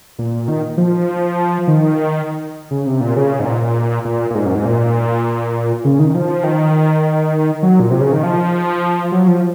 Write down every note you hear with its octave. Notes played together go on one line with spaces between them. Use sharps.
A#2
D#3
F3
D#3
C#3
C3
A#2
C#3
G#2
A#2
A#2
A#2
G#2
F#2
G#2
A#2
C#3
D#3
D#3
F3
D#3
F#3
A#2
C3
C#3
D#3
F3
F#3
F3